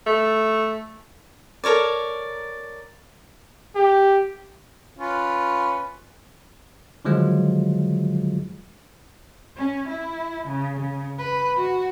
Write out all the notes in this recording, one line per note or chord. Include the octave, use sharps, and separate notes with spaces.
A3
A4 A#4 C#5 D5
G4
C#4 F4 B4
D3 D#3 F3 F#3 G#3 F4
C#4
E4
C#3
C#3
B4
F#4